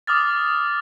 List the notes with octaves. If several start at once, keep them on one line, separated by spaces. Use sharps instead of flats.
D6 D#6 F6 A6